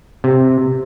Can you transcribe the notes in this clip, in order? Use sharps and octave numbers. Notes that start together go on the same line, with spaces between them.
C3